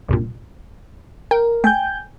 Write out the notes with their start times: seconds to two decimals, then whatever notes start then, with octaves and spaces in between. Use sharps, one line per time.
0.09 C2 G2 A#2
1.31 A#4 G5
1.64 A3 G5 G#5 G6